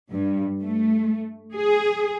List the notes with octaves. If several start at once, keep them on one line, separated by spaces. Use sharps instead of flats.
G2
A3
G#4